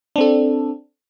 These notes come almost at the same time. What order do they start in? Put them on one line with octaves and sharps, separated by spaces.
D4 C4 A4